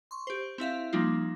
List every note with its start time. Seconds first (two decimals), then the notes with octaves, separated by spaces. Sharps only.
0.11 C6 C#6
0.27 G4 C5
0.58 C4 E4 E5 F5
0.93 F3 G3 A#3 D#4 F4